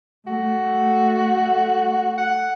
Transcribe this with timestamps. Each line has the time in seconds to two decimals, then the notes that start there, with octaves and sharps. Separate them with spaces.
0.27 A3 F#4
2.18 F#5